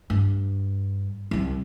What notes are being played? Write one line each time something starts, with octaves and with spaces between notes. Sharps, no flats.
G2
C2 G3